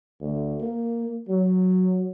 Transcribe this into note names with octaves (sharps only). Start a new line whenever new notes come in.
D2
A#3
F#3